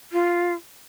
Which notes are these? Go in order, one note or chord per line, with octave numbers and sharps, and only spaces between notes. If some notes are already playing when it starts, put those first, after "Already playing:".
F4